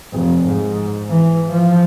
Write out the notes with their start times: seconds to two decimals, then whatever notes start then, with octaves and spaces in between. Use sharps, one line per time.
0.13 F1
0.47 G#2
1.10 E3
1.52 F3